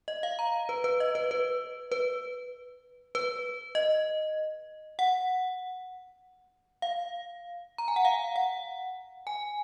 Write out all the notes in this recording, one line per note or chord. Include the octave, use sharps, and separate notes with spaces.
D#5
F5
A#5
B4
B4
D#5
B4
B4
B4
B4
D#5
F#5
F5
A#5
G#5
F#5
F5
F#5
G#5